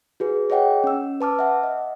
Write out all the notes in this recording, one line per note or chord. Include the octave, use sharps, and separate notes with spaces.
F#4 G#4 B4
G#4 C#5 D#5 F#5 G5
C#4 E6
B4 A5 D6 F6
E5 F#5
D#5